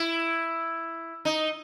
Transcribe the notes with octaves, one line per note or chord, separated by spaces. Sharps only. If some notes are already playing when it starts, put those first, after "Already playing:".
Already playing: E4
D#4